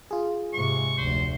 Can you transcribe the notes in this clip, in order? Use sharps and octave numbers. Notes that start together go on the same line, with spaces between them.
F4 G#4
G#2 C3 C#6
F1 D2 C5